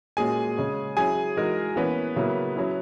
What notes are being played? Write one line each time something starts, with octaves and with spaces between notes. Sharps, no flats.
A#2 G#3 C#4 F#4 G#4 G#5
C#3 G#3 C#4
F#3 C#4 E4 G#4 G#5
E3 G#3 D#4 F#4 A#4
E3 A#3 B3 C#4 B4
C#3 F#3 A#3 E4
F#3 C#4 E4